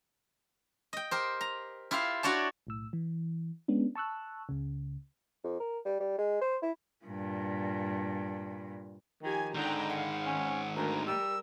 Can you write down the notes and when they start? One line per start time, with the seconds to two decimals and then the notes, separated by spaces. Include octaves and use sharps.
0.93 D#5 G5
1.11 G4 A#4 C5
1.41 A#5
1.91 E4 F4 G4 C5 F5
2.23 D4 F#4 C#5 D5 A5
2.67 B1 A2 E6
2.93 E3
3.68 G#3 B3 C#4 D4
3.95 A5 C#6 E6 F#6
4.49 C#2 C#3
5.44 F2
5.60 A#4
5.85 G3
6.00 G3
6.18 G#3
6.41 C5
6.62 E4
7.05 G2 A#2
9.23 D#3 F3 G4 G#5
9.55 G#2 D3 D#3 F#5 G5 A#5
9.89 F5 F#5
10.26 C#4
10.76 D2 A#4 A#5
11.06 G3 E6